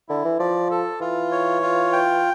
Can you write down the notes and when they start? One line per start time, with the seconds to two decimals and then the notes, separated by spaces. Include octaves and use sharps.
0.09 D3 E4
0.25 E3
0.39 F3 D5
0.70 A4
1.00 E3 F4
1.31 C#5
1.62 F4
1.93 G5